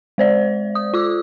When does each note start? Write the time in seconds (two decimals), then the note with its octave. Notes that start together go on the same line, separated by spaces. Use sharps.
0.18 G#3 C5 D5
0.75 D#6
0.94 F4 D6 E6